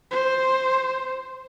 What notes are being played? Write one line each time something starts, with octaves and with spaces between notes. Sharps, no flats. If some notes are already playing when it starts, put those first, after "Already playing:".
C5